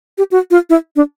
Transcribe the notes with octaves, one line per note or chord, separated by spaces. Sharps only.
G4
F#4
F4
E4
D4